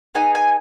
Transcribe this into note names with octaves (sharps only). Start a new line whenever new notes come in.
B3 D#4 G#4 G#5
G#5